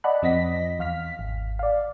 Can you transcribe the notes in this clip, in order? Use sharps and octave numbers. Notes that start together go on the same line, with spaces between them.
D5 D#5 F#5 A5 B5 F#6
F2 F3 C4 D#5 A#6 B6
E2 F5 F6 B6
G#1
D5 F5